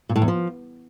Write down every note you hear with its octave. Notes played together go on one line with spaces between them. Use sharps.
A#2
A2
E2
F3